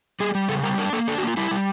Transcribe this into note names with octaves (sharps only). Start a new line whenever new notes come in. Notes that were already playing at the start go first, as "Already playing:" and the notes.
G3 G#4
G3
C#3 A4
G3 A#4
D4 A#4
A#3 A4
D4 A4
F#4
A#3 F4
G3 E4
G3